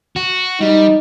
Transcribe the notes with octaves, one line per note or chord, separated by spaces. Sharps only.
F#4
G3 D#4